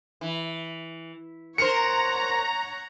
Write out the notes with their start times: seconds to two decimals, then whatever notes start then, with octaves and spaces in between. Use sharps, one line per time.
0.21 E3
1.58 A#4 C5 C#5 F#5 A#5 C#7